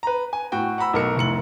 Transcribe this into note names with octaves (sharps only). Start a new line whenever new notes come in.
B4 A#5
G#5
A2 F#4 G5
F#5 A#5 B5 E6
B1 A3 A#4 E6 C#7
F1 A2 C#7 F#7